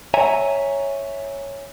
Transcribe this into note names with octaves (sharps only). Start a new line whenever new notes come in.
C#5 E5 G#5 A#5